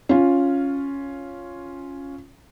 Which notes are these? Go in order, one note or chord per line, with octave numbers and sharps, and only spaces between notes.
C#4 F4